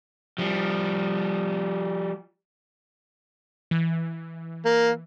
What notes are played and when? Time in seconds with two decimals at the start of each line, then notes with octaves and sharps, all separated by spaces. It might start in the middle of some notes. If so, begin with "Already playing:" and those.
0.38 F3 G3
3.71 E3
4.66 A#3